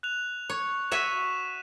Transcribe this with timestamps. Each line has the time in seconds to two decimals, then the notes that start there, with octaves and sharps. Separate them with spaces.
0.03 F#6 F7
0.49 C#5
0.91 F#4 C#5 E5 B6 D#7 E7